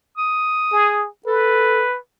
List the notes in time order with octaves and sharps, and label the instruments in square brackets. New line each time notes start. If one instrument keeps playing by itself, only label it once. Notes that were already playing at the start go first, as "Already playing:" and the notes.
[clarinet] D#6
[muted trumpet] G#4
[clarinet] A4 [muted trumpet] B4